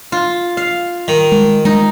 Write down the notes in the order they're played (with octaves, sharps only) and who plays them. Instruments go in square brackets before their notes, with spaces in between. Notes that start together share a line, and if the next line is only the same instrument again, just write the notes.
[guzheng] F4
F5
[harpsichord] D#3
[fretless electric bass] G#3
[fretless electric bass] G#3 [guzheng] D#4